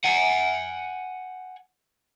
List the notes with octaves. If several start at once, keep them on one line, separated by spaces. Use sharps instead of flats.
F#5 G#5